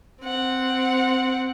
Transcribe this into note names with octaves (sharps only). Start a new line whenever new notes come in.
C4 F#5